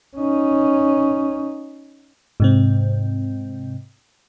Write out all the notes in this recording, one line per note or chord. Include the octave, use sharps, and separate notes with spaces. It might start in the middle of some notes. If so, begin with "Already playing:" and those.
C#4 D#4
G#2 C3 C4